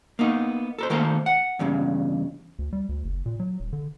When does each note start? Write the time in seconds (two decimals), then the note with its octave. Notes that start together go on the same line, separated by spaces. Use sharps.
0.19 A#3 B3 D#4
0.79 A4 A#4 C5
0.90 D#3 A3 A#3 A4 A#4 C5
1.26 F#5
1.59 E2 G2 C#3
2.59 D2
2.73 G3
2.89 D2
3.05 F#1
3.26 A#2
3.40 F#3
3.60 D#1
3.73 D3